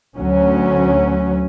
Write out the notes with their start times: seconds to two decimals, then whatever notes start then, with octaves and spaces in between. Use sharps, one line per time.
0.16 D2 F#3 C#4